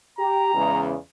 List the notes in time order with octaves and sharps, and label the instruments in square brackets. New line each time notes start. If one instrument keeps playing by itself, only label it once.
[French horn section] G4 [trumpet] A#5
[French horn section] E2 C#3 G#3